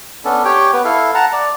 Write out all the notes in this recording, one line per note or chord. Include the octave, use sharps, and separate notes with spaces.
B3 C#4 D4 A4
G4 C#5 G5
B3 B4
E4 A4 F5
F#5 A5 A#5
D5